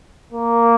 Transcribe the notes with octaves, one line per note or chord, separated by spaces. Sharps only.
A#3